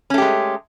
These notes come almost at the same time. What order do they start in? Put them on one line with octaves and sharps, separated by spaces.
C#4 A3 G4 G#3